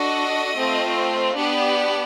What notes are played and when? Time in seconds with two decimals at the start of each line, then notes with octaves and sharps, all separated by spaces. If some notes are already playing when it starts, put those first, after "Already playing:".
Already playing: D4 F#4 A4 D#5
0.56 A3 C4 F4
1.35 B3 D4 G4